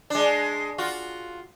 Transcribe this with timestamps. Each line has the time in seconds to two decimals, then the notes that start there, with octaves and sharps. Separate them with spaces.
0.10 G#3 D4
0.78 F4 F#4